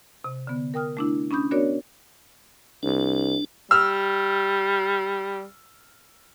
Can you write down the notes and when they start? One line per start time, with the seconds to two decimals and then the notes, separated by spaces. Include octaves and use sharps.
0.24 C3
0.47 D3 B3
0.74 A#4 G5 D#6 F6
0.97 A3 D4 E4
1.31 C#4 D4 B5 D#6 G6
1.51 B3 D4 F#4 A#4 C#5 D5
2.83 C2 D4
3.71 G3 E6 F6